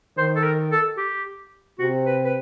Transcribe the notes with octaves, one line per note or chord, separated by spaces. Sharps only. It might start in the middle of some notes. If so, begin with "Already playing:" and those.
D#3 C5
A4
A#4
A4
G4
C3 F#4
B4
B4